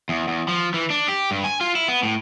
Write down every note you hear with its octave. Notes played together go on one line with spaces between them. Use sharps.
E2
E2
F3
E3
D4
G4
G2
G#5
F4
E4
B3
A2